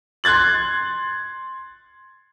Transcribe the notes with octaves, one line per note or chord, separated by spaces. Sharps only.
C6 F#6 G#6 A6 F#7